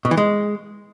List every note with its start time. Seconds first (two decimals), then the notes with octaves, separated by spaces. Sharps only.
0.05 B2
0.11 E3
0.17 G#3